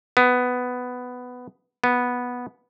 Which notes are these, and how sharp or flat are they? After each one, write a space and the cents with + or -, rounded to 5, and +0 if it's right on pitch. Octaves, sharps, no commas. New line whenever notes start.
B3 +10
B3 -5